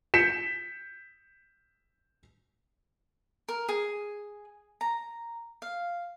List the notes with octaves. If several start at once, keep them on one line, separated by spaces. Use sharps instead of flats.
G6 B6 C#7 E7
A#4
G#4
A#5
F5